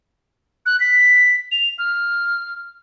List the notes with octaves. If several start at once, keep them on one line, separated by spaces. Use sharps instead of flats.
F#6
B6
F7
F6